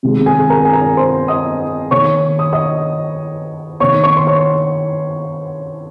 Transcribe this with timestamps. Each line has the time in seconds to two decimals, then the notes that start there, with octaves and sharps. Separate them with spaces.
0.03 C3 D#3 G#3
0.26 G#4 G#5
0.50 A#4 A#5
0.65 G#5
0.73 A#4 A#5
0.97 C5 C6
1.28 D#5 D#6
1.91 D#3 A#3 C#5 C#6
2.39 D#6
2.53 D#5 D#6
3.80 D#3 A#3 C#5 C#6
4.04 C#5 C#6
4.17 C6
4.27 C#5 C#6